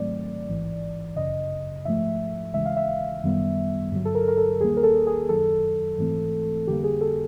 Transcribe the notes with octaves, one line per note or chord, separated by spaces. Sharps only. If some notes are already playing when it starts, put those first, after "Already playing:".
Already playing: G#2 D#3 F#3 A3 C4 D5
A1 G#2 E3
G1 F#2 C#3 D#5
G#2 F3 A3 E5
D#2 C#3 E3 G#3 E5
F5
E5
F#2 D#3 G3 B3
G2 D3 F#3
A4
A#4
A#4
A4
D#2 D#3 G3 A#3 G#4
A#4
A4
G#4
F#2 D#3 F#3 A4
G#2 E3 A3 C4
F2 D3 G3 A#3 G4
G#4
A4